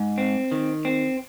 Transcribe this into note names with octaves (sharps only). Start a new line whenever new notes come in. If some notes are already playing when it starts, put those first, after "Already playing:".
Already playing: G#2
C4
D#3
C4